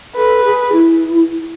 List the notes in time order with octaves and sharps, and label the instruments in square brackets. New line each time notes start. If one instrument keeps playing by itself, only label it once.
[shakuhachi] A4 [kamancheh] B4
[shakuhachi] G#4
E4